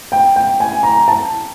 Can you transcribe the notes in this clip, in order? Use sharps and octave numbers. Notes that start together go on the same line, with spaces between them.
G5
G5
G#5
A#5
A5